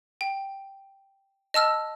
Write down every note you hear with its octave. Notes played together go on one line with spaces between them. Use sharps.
G5
D#5 A5 E6 F6